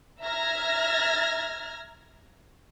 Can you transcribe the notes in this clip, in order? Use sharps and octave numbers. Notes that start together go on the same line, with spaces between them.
E5 A#5 F6 G#6 A#6